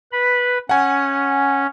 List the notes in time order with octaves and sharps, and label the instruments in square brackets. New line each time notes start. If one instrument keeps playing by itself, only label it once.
[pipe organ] B4 B5
[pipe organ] C#4 [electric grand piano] F#5 G#5